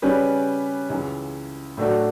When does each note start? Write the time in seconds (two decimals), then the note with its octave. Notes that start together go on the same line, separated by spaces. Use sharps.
0.02 C#3 G3 C#4 G4 B4
0.90 C#2 C#3 E3
1.77 A2 F#3 A3 D4 F#4